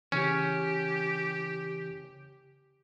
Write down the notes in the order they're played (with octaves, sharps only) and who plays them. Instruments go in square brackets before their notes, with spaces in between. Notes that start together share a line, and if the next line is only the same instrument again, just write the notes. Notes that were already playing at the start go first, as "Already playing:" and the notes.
[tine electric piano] C#3 E3 [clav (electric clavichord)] C#4 [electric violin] G4